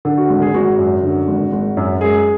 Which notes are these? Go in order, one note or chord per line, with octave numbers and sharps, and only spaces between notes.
D3
F#4
G#1
G#4
G#1 F#4
F#2
D3
G#1
G#1
F#2
G#3 G#4